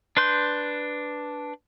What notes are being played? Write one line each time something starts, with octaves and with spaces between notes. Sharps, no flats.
D4 B4 C6 G6